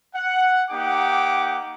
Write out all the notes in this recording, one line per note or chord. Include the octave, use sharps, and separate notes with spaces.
F#5
A#3 D#4 G4 F#5 G5 D6